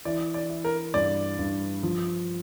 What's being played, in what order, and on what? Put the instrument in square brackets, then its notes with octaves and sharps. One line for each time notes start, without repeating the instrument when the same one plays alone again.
[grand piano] E3 [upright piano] D5
[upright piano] D5
[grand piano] E4
[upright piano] A#4
[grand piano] G2 [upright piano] D5
[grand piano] G2
F3